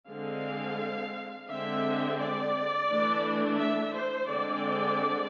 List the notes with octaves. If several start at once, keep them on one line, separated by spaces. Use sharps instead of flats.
D3 G#3 C4 F5
D3 G#3 C4 E5
D5
E3 A3 D4
E5
C5
D3 G#3 C4 D5